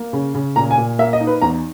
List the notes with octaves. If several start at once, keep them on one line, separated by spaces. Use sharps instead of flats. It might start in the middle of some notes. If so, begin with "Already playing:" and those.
Already playing: A#3
C#3
C#3
A#2 A#5
G#5
A#2
A#3 E5
D#5
D#4
B4
E2 A#5